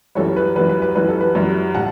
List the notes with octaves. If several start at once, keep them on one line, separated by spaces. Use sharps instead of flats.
F#2 E3 G3 A4 C#5
B4
F#2 E3 G3 B4
B4
B4
F#2 E3 G3 B4
A4
B4
F#2 E3 G3
A2 G3 F#5 A5